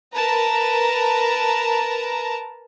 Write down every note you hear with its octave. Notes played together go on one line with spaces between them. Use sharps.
A#4 B4 A5 A#5